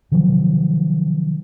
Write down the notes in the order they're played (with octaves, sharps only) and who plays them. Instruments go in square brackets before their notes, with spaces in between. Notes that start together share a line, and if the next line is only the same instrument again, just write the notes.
[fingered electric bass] C3 D#3 F3 F#3